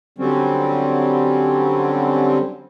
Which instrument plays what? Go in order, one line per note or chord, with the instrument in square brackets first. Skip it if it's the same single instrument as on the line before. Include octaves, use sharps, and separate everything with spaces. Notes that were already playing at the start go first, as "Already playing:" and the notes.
[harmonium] D3 F#3 G3 C4 C#4